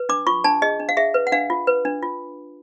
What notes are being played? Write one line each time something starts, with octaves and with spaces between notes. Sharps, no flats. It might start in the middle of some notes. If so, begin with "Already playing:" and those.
Already playing: B4
D4 D6
F4 C#6
D4 A5
G#4 D#5
D4
F5
G#4 E5
B4
F#5
D4 F5
F4
B4
D4
F4